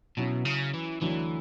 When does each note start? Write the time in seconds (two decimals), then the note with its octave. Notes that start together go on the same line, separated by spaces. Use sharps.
0.17 B2 F#3 C#4 E4
0.45 C#3
0.74 E3
1.02 D2 D3 E3 F#3